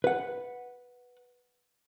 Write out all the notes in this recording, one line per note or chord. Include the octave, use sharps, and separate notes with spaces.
B4 F#5